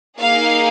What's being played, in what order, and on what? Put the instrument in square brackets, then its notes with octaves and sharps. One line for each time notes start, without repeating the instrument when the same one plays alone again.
[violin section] A#3 D#4 G#4 F5